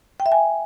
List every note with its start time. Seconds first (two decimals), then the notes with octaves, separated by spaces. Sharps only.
0.20 G5
0.26 E5
0.32 G#5